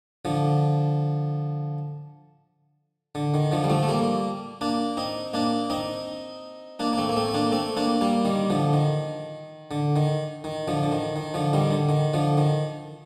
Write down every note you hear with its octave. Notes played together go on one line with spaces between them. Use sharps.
D3 F3
D3
D#3
D3 F3
G3
F3 A3
A3
G3 A#3
A#3 D4
C4 D#4
A#3 D4
C4 D#4
A#3 D4
A#3
A3 C4
A#3
A3 C4
C4
A#3 D4
A3 C4
A#3 D4
G3 A#3
D#3 G3
D3 F3
D#3
D3
D#3
D#3
D3 F3
D3
D#3
D#3
D3 F3
D#3 G3
D3
D#3
D3 F3
D#3